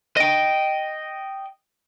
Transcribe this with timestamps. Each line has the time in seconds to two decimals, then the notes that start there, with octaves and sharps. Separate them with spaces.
0.17 D#5 G5